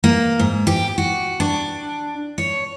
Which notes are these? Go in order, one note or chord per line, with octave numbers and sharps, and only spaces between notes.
A#3
G#2
G4
F#4
D4
C#5